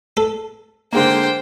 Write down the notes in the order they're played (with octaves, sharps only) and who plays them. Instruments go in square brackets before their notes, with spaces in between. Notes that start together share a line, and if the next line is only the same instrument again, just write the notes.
[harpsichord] A4
[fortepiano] D3 G#3 A#3 [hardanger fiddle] C5 G5